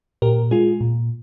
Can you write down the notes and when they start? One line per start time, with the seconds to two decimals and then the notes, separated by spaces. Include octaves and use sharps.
0.22 A#2 G4 A#4
0.51 G#3 F4 G#4
0.81 A#2